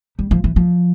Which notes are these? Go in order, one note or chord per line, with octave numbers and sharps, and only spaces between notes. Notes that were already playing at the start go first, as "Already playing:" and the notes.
G3
F3
E3
F3